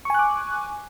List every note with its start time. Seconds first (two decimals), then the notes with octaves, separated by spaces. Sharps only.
0.05 C#6
0.10 G#5
0.14 F#6
0.19 D6